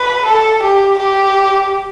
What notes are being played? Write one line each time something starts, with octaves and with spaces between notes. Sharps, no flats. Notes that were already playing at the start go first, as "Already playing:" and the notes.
Already playing: B4
A4
G4
G4